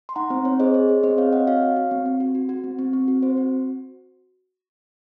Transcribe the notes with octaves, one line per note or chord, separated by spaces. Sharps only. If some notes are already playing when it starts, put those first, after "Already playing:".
C6
D#4 F#5 A#5
C4 C5
C4 C#5
G#4 C5 D#5
G#4 C#5
G#4 C#5
C4 C5 D#5
C4 C#5 F5
C4 D#5 F#5
F#4 C#5 F5
F#4
F#4
C4
C4
F#4
F#4
F#4
C4
C4
C4
F#4
C4 C5
F#4